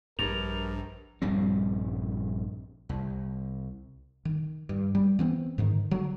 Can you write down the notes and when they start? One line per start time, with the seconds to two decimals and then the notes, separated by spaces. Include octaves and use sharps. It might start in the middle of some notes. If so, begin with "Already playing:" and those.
0.19 A#1 G2 A#4 F7
1.22 A#1 G2 G3 C4
2.89 C2
4.25 D#3
4.69 G2
4.95 G3
5.19 E3 B3 C4
5.58 G#2 D3 D#3
5.91 D3 F#3